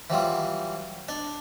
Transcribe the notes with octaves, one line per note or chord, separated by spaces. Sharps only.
E3 F#3 G3 F4
D4 A5